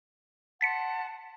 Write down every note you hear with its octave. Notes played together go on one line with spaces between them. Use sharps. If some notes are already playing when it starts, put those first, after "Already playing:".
F#5 A5 C6 A6 B6 C#7